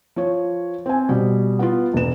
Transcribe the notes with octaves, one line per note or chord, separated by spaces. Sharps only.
F3 C#5
C4 G#5
B2 G3
B3 F4
E1 E7